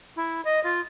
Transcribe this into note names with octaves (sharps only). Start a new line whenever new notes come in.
E4
D#5
F4